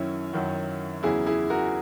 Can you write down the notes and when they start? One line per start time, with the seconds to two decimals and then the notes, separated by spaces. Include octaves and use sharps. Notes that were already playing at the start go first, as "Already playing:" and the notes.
Already playing: F#2 D#3 F#3 C#4 E4
0.33 F#2 D#3 F#3
1.03 E2 C#3 F#3 E4 G#4
1.27 E4 G#4
1.50 F#4 A#4